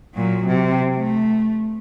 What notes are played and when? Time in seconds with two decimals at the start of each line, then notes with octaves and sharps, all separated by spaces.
0.15 A#2 F#3
0.47 C3
0.96 A3